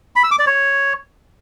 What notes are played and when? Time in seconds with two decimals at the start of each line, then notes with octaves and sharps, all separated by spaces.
0.16 B5
0.24 E6
0.31 D6
0.39 D5
0.47 C#5